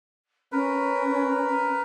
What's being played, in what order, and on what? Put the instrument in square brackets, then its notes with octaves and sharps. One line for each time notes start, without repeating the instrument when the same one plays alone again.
[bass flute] C#4 [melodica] A#4 B4